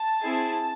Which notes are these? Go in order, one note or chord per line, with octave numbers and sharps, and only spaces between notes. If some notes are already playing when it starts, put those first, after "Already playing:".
Already playing: A5
C4 E4 G#4